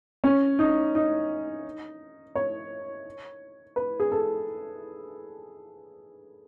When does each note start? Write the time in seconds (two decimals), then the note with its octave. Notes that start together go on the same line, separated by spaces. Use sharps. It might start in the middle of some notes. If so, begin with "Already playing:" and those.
0.24 C#4
0.59 D#4
0.95 D#4
2.35 C#5
3.76 B4
4.00 G#4
4.12 A4